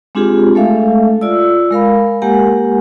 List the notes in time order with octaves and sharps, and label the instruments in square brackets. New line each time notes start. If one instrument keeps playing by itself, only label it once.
[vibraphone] G#3 C4 D4 F4 G4 G#4
G#3 A3 A4 E5 F5
F4 D5 E6
G#3 A#4 F5 B5
G#3 A#3 G4 A#4 F#5 G#5